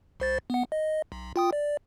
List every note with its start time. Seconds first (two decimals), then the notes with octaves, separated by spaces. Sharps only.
0.20 C2 C5 A6
0.50 B3 F#5
0.72 D#5
1.12 B1
1.36 F4 G5 D#6
1.53 D5